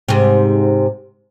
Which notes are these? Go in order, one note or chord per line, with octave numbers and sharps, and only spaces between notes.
G#2 C3